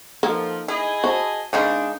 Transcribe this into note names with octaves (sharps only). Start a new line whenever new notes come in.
F3 A#3 D#4 A4 F#5
E4 G#4 D#5
F#4 C5 A5
C#3 G#3 C4 D4 D#4 A#4 C#5